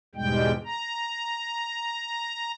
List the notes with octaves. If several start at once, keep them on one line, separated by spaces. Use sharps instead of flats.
E2 G#2 B2 G3 G#3 G5
A#5